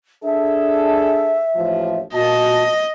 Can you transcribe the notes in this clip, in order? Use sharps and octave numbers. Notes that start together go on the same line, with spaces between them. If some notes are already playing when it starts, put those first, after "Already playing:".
D4 G#4 A4 E5
A1 D#2 F3
A#2 F#4 D#5 A5